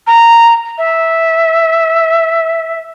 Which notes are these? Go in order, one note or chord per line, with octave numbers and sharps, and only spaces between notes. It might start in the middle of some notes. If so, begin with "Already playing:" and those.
A#5
E5